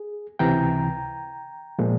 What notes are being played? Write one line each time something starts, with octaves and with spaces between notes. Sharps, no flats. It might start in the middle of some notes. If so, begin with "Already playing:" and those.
Already playing: G#4
C#2 C3 E3 G5 A#5
A#2 F3 G#3